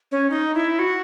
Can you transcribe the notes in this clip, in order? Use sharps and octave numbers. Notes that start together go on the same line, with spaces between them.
C#4
D#4
E4
F#4